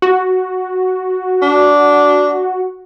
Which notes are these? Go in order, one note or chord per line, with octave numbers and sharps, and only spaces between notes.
F#4
D4